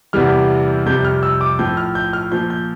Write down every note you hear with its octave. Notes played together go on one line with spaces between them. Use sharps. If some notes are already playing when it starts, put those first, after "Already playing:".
E2 C3 E3 G3 F6
F2 C3 G3 G6
F6
E6
D6
A2 F3 G6
F6
G6
F6
A#2 F3 G6
G6